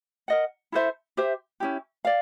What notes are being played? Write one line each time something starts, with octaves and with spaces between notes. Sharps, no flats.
A#4 D#5 F#5
E4 A4 C5 E5
G4 C5 E5
C#4 E4 G4
D5 F5